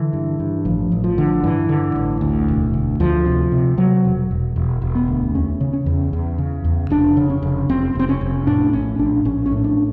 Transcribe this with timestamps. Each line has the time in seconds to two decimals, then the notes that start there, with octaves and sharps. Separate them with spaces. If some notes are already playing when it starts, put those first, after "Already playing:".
Already playing: D3 E3
0.13 G2
0.40 G2
0.65 A1 F3
0.92 A1
1.04 F3
1.18 D3
1.44 G2 E3
1.69 D3
1.96 A1
2.21 D2
2.48 E1
2.74 D2
3.00 D2 F3
3.26 C3
3.52 C3
3.77 C3 F#3
4.05 E1
4.31 E1
4.56 E1
4.82 E1
4.95 B3
5.08 D2
5.34 E2 C#4
5.61 C#3
5.73 C#4
5.86 E2
6.13 E2
6.38 C#3
6.64 E2
6.90 F1 D4
7.17 C#3
7.30 C#4
7.42 F1
7.69 F1 C4
7.95 F1 C4
8.09 C#4
8.21 F1
8.47 A2 D4
8.73 A#1 C#4
8.99 A#1 D4
9.25 A#1 C#4
9.46 C#4
9.52 A2
9.64 D4